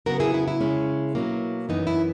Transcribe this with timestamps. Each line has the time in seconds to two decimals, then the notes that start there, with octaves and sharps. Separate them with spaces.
0.06 C#3 F#3 B3 F#4 A#4
0.20 E4 G#4
0.34 E4
0.48 E4
0.61 C#3 G#3 C#4
1.15 B2 F#3 A#3
1.69 F#2 E3 B3 D#4
1.87 E4